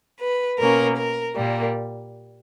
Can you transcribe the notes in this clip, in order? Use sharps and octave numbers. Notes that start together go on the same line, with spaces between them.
B4
B2 A#3 C#4 A#4
A#4
A#2 G3 A#3